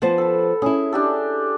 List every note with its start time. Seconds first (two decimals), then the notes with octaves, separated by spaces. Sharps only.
0.02 F3 B3 C5 A5
0.18 A4 B4
0.62 C#4 E4 G#4
0.93 D4 G4 A4